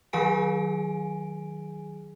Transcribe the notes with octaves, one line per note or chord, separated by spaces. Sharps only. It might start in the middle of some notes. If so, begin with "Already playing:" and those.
D#3 F#3 G#4 G#5 D7